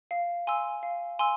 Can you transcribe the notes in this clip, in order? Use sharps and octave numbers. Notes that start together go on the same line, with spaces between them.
F5
G#5 C6 E6
F5
G#5 C6 E6